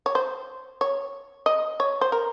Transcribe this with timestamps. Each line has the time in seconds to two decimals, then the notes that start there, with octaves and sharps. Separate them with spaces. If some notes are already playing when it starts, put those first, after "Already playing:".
0.06 C#5
0.15 C5
0.81 C#5
1.46 D#5
1.80 C#5
2.01 C5
2.12 A#4